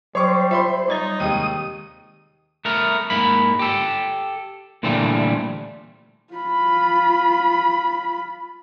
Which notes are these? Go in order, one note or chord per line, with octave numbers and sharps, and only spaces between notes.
F#3 G3 C5 C#5 C#6 D6
F4 E5 B5 C6
G3 D#4 C5 C#5
D#2 C3 G#3 D#6
A3 B3 A#4
G#2 A#3 B5
G4 A4
A#2 D3 E3 F3 G3 A3
F4 B5